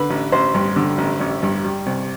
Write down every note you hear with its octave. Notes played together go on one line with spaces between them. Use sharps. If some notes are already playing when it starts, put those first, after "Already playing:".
Already playing: D3 B4
A1
A1 C5
G2
D3
A1
A1
G2
G3
C2